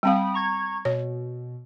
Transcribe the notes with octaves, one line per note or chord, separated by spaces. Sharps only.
G3 C4 F5 G5 B5 D#6
A#5 C#6 G#6
B2 C#5